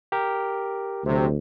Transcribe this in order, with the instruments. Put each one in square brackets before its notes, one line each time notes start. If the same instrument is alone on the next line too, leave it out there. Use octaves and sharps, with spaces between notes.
[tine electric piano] G4 A#4
[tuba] D2 [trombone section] C3 F#3